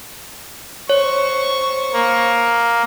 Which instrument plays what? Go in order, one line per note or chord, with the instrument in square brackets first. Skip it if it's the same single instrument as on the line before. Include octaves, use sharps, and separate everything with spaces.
[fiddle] C5 C#6 [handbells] C#5
[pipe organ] A#3